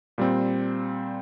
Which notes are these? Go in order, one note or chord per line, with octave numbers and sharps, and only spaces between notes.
A#2 G3 C4